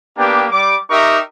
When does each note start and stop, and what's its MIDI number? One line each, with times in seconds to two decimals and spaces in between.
0.18 0.46 58
0.18 0.46 59
0.18 0.46 62
0.18 0.46 67
0.51 0.76 55
0.51 0.76 86
0.90 1.17 63
0.90 1.17 67
0.90 1.17 70
0.90 1.17 76
0.90 1.17 85